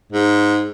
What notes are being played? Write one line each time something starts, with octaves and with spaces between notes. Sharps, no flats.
G#2